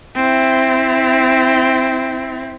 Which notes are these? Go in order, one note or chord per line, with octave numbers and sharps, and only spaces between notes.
C4 E4